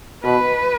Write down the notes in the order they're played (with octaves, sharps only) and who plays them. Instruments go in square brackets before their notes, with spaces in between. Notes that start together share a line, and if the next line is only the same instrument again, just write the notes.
[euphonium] B2 [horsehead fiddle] B4